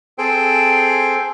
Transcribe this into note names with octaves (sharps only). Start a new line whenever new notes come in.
C4 G#4 A4 C5 G5